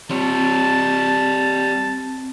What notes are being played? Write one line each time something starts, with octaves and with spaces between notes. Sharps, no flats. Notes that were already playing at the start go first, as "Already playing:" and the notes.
G3 C4 C#5 A5